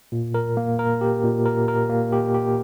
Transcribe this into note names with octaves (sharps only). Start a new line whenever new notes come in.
A#2
A#4
A#3
A#4
G4
A#2
A#4
A#4
A#3
G4
G4